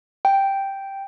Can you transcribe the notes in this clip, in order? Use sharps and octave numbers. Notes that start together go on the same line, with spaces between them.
G5